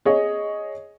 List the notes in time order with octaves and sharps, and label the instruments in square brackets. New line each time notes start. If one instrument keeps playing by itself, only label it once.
[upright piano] G#4 C#5 D#5